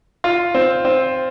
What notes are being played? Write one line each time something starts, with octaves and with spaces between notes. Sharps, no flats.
F4
C4
C4